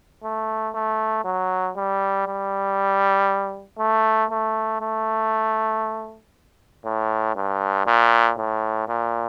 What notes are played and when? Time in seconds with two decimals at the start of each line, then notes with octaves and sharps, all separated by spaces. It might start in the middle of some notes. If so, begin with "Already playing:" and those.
0.24 A3
0.75 A3
1.24 F#3
1.76 G3
2.27 G3
3.79 A3
4.31 A3
4.81 A3
6.85 A2
7.36 G2
7.87 A#2
8.38 A2
8.88 A#2